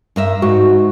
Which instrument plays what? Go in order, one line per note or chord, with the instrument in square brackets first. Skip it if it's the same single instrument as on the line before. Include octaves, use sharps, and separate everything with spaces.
[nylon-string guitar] G2 A#4 E5
[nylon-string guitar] G#2 [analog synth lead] F#4